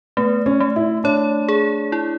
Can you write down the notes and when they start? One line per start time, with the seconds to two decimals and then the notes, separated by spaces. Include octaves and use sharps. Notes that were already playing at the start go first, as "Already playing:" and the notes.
0.17 A3 B3
0.46 C#4
0.60 A3
0.76 E4
1.04 D4 C#5
1.49 G#4
1.92 E4